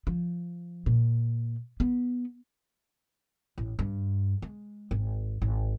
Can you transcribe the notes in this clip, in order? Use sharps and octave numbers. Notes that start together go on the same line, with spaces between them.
F3
A#2
B3
A1
G2
G#3
G#1
G#1